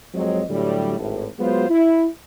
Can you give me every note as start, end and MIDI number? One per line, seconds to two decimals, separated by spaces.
0.14 0.43 41
0.14 0.43 54
0.14 0.43 56
0.14 0.43 60
0.14 0.43 73
0.14 0.43 75
0.50 0.98 45
0.50 0.98 50
0.50 0.98 54
0.50 0.98 55
0.98 1.26 32
0.98 1.26 45
1.39 1.70 54
1.39 1.70 56
1.39 1.70 59
1.39 1.70 65
1.39 1.70 66
1.39 1.70 72
1.70 2.07 64